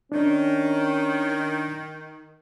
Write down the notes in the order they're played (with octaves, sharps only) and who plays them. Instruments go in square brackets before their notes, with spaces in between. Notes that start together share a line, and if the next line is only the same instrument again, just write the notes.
[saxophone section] D#3 [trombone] C#4 [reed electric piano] D4